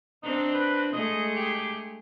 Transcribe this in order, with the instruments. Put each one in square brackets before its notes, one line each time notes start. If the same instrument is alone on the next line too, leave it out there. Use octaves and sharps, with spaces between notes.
[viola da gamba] C4 D4 [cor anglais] D#4
[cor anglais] B4
[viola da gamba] G#3 A3 G#4 [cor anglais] D#5
[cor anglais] G4